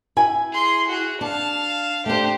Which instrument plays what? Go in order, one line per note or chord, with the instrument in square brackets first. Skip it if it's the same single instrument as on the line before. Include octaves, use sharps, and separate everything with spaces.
[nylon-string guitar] E4 G#5
[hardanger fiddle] G#4 C6
F#4 G#4
[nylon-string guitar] D4 [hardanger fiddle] F5 A5
[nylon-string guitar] A3 D4 [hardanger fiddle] G4 C5